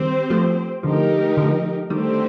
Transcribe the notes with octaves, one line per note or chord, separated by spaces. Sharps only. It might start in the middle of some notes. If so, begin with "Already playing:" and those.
Already playing: D#3 G3 C4 G4 C5
F3 A3
D3 F3 A3 D#4 G4 A#4
D3 F3
D3 D#3 G3 A3 C4 G4 C5